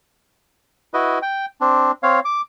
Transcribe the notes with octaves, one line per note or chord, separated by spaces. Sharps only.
E4 F#4 B4 D#5
G5
C4 D4
C4 C#5 F5
D6